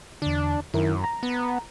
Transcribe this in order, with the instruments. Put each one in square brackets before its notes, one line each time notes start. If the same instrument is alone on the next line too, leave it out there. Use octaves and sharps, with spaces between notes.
[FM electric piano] E2 D3 [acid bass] D4
[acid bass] F#2 [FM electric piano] D#3 E4 A#4
[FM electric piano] A#5
[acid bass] B3